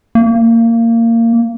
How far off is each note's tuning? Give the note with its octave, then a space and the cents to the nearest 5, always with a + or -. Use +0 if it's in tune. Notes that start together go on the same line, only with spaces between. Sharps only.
A#3 -20